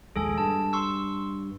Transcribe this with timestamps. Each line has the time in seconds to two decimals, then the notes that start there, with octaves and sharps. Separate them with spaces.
0.16 A#1 D#2 G#3 G#4 A4 G#5
0.38 G2 A5
0.73 C6 C#6 E6